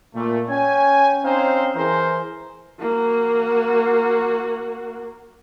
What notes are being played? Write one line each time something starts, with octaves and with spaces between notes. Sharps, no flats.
A#2 A3
C#4 G5 G#5
C4 C#4 D#4 C5 F5
E3 G#4 A#4 C5
A#3 F#4